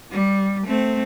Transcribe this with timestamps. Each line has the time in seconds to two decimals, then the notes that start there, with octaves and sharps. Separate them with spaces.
0.11 G3
0.67 A3 C4